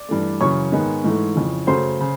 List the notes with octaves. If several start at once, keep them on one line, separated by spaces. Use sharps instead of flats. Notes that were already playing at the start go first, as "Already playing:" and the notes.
Already playing: D5 D6
G2 E3 A3
F#2 C#3 E3 C#5 C#6
G#2 D#3 G#3 B3
G#2 E3 A3
F2 C#3 E3
F#2 C#3 F#3 A3 C5 C6
C#3